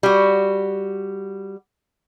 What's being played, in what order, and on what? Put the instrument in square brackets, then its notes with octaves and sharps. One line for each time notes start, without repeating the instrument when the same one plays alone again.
[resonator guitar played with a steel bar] G3 F#4